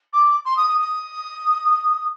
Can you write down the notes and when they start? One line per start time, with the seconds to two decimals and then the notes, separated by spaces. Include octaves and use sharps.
0.13 D6
0.45 C6
0.56 D#6
0.67 D#6
0.78 D#6